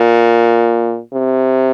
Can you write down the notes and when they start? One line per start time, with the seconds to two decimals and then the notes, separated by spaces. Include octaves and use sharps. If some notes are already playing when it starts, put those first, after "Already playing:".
Already playing: A#2
1.13 C3